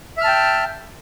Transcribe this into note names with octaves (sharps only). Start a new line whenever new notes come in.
E5 G5 A5 F6